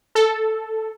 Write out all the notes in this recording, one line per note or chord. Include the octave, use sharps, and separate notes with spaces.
A4